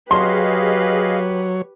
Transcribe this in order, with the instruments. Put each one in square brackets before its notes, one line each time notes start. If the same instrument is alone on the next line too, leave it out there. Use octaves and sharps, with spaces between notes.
[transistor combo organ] F#3 C#5 [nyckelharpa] G4 B4 [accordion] G#4 D#5 F5 [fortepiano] C6